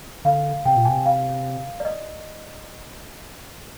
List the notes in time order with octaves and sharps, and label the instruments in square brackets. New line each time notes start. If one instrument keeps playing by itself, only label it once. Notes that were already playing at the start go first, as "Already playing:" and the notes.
[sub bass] D3 [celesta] F5
[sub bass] C3 [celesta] G5
[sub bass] A#2
[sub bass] C3 [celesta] G#5
[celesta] F5
D5
D#5